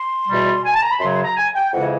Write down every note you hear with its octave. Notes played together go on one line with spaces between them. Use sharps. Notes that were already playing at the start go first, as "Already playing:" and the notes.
Already playing: C6
E2 B2 G3
G#5
A5
A#5
B5
F#2 C#3 F#3 C6
C6
A#5
G#5
G5
F2 C#3 E3 G#3 F#5